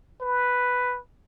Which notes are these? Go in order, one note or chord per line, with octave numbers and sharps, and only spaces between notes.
B4